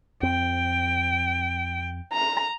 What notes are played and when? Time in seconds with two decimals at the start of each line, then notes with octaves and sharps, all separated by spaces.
0.23 F2 C4 G5
2.13 A#5